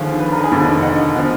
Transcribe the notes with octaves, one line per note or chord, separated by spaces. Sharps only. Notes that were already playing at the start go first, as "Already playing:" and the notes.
Already playing: D#2 D3 F3 F4 G#4
B4
A#4
G#4 B4
F1 D#2 D3 F3
D#5 F#5
D3 F3